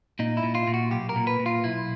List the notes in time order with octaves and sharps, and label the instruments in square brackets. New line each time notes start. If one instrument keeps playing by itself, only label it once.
[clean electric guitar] A#2 D#4
E4
A#2
F4
A#2
F#4
B1 G4
A#4
A#2
B4
A#2
F4
B1 E4